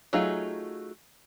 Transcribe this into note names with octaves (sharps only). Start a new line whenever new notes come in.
F#3 A3 D#4 F4 G#4